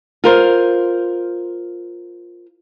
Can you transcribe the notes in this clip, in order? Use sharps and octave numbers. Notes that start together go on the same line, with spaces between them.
F4 A#4 C5